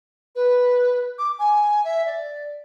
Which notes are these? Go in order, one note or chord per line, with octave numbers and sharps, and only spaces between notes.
B4
D6
G#5
E5
D5